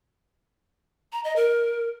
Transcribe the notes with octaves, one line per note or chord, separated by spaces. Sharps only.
A#5
D#5
A#4